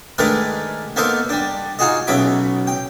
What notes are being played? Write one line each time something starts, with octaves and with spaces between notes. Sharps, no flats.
D#3 G#3 A3 D4 A#4 B4
A#3 B3 D#4 A4 A#4 C5
G3 D4
D#4 F4 F#4 G#4 D#5
B1 C#3 B3 E5 B5 D6
G5